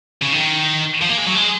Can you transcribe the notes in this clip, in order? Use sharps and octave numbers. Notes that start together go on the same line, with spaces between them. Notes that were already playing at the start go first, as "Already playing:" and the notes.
C#3
D#3
F3
A#3
G#3
F#3
G#3